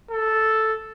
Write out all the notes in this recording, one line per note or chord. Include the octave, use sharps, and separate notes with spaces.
A4